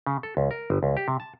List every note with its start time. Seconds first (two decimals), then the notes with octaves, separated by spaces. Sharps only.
0.07 C#3
0.23 A4
0.37 C#2
0.51 A#4
0.70 G1
0.83 C#2
0.97 G4
1.08 C3
1.20 A5